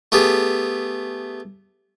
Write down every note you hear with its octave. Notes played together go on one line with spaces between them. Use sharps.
A3 B3 G4 G#4